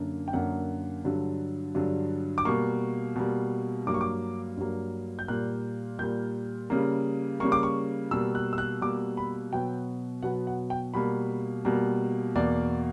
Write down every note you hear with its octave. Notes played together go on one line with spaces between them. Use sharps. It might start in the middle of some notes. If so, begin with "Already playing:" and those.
Already playing: F#2 D3 A#3
G5
F#2 D3 A#3 F#5
G2 D3 F#3
G2 D3 F#3
D6
B2 G3 A#3 C#6
B2 G3 A#3
G2 F#3 A#3 D6
C#6
D6
G2 F#3 A#3
G6
A#2 G3 A#3 F#6
A#2 G3 A#3 G6
C#3 G3 A#3
C#3 G3 A#3 C#6
D6
C#6
B2 G3 A#3 E6
F#6
E6
F#6
B2 G3 A#3 D6
B5
B2 F#3 B3 G5
B2 F#3 B3 F#5
F#5
G5
B2 G3 A#3 B5
B2 G3 A#3
E2 B2 A#3 D5